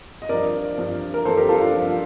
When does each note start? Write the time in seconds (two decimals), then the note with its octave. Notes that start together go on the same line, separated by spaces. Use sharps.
0.22 D#5
0.29 G2 F3 A#4 D5
0.78 G2 F3
1.14 A#4
1.25 G2 F3 A4 C5
1.37 G4 A#4
1.49 F4 A4
1.61 D4 F4
1.74 G2 F3